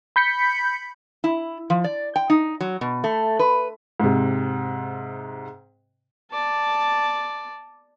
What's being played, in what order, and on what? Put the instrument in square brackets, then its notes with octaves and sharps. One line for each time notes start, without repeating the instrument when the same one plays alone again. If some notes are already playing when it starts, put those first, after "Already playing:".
[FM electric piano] B5 G6 B6 C#7
[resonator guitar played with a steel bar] E4
F3
D5
G5
D#4
F#3
B2
A3
B4
[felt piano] G#2 C3
[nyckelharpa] D5 A5